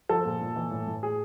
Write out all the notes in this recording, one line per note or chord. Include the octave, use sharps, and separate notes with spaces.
F3 A4
A#2
A#2
E3
A2
A2
G#4